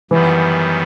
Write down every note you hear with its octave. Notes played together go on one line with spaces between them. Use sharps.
F#2 D#3 E3 G3 B3